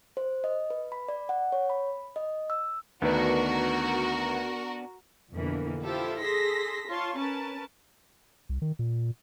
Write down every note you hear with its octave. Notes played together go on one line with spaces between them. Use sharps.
C5
D#5
B4
B5
D5
F#5
C#5
B5
D#5
E6
D2 D#3 B3 D4 F#4 A#4 B4
F2 B2 D3 E3 A#3
E4 F4 G4 A4 C5
G#4 A4 C6 A#6 B6
F4 C#5 A5 C6 C#6
C#4 A#4 B4 A5
C2
D#3
A#2